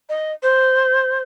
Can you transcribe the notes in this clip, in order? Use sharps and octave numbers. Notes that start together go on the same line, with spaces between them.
D#5
C5